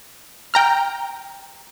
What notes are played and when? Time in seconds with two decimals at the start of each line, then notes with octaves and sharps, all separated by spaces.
0.54 G5 A#5 F6